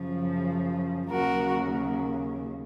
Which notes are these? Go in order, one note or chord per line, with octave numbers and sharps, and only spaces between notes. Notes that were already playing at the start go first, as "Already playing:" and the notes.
Already playing: F#2 C#3 F3
D#2 C#3 F#3 F#4 A#4